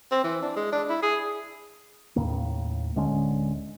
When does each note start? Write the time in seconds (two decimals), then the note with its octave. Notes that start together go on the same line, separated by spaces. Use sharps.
0.11 C4
0.24 E3
0.42 D4
0.56 G#3
0.72 D4
0.89 E4
1.02 G#4
2.16 D#2 A2 C#3 A#3
2.96 D1 D3 G#3 C#4